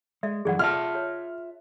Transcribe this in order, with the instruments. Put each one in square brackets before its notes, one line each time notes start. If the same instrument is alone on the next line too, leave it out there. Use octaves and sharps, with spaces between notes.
[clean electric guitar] G#3 [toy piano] D5 E5
[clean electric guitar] F#2 E3 F#3 [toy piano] G#4 D5 F#5
[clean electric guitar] F4 E5 A5 [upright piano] F6
[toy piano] C#5